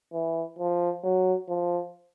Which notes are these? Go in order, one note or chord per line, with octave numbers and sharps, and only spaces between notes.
E3
F3
F#3
F3